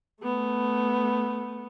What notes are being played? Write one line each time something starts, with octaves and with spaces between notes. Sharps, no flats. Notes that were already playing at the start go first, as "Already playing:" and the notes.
A3 B3